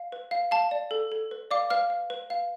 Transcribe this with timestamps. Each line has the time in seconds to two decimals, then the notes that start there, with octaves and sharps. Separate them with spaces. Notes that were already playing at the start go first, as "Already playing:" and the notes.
Already playing: F5
0.12 B4
0.31 F5
0.51 F5 A5
0.71 D5
0.91 A4
1.12 A4
1.31 B4
1.51 D5 F5 D6
1.70 B4 F5 F6
1.90 F5
2.10 B4
2.30 F5